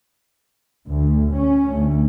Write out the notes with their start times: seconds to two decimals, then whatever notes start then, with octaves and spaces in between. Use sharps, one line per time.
0.87 D2
1.33 C#4
1.74 D2